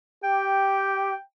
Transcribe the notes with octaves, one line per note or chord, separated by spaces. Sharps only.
G4 G5